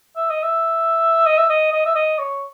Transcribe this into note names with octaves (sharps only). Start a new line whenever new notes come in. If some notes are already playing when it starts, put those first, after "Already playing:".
E5
D#5
E5
D#5
E5
D#5
D#5
E5
D#5
C#5